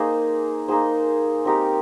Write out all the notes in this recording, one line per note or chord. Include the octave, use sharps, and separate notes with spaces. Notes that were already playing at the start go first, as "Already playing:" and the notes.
Already playing: A#3 D#4 G#4 C5
A#3 D#4 G#4 C5
C4 D#4 G4 A#4